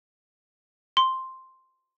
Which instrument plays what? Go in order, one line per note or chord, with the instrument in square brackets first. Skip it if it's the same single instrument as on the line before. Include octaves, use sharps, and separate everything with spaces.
[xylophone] C6